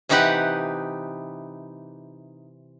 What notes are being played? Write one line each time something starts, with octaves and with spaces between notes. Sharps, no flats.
C3 E3 D#4 G4 B4 F#5